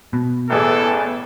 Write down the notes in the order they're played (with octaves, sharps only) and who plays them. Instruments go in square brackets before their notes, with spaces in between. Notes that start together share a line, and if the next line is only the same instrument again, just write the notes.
[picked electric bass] B2
[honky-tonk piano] A1 E2 G#4 [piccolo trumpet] A4